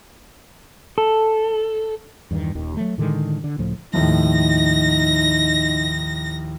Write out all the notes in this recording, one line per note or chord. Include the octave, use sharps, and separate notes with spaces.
A4
E2 G2 D3 D#3
D#1 D#2 D#3
F#3 A3
A2 D3 D#3 G#3
D3
C#2 A2 F3
D#2 A2 F3 D#4 A#6